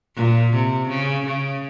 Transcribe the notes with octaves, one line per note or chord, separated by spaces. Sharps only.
A#2
C3
C#3
C#3